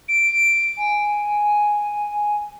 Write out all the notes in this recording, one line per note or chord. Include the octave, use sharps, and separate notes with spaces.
D7
G#5